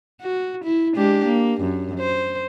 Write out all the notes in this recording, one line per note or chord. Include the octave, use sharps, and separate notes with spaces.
F#4
E4
G#3 D4 G4
A#3
F#2
C5